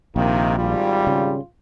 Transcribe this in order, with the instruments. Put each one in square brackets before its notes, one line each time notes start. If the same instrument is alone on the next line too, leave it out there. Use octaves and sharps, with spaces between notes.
[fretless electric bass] A#1 [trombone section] C3 D#3 [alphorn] A#3
[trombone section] G#1 G3 [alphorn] F4
[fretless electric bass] C#3